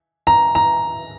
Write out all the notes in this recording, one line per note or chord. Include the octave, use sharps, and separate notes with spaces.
A#5
A#5